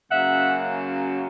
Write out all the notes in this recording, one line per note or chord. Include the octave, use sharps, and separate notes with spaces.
F#2 C#3 F#3 A#3 E5 F#5